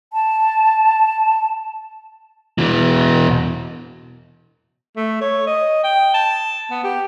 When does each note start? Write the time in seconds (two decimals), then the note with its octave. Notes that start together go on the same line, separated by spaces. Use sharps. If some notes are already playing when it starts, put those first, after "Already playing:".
0.13 A5
2.58 B2 E3
4.97 A3
5.21 C#5
5.47 D#5
5.84 G5
6.14 A5
6.71 B3
6.84 G4